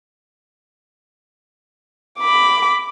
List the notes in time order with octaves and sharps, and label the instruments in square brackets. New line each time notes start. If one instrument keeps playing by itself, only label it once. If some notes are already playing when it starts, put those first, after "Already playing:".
[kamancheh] B5 D6